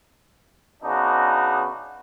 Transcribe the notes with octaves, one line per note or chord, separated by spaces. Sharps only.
C#3 B3 D4 D#4 F#4